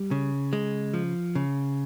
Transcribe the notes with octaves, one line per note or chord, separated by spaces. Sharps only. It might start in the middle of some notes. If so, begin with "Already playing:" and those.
Already playing: G3
C#3
G#3
F3
C#3